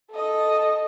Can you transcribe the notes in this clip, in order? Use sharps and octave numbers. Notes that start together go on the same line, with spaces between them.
A4 D#5